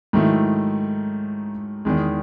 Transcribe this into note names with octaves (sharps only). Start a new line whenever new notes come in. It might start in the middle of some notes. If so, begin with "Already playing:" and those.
G#2 D#3 F#3 A3 E4
E2 D#3 G#3